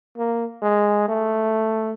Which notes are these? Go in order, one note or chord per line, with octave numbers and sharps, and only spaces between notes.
A#3
G#3
A3